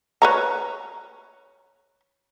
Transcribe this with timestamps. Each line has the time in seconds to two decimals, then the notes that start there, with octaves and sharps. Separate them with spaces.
0.22 B4 C#5 A#5